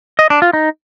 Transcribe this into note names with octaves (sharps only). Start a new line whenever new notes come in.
D#5
D4
F4
D#4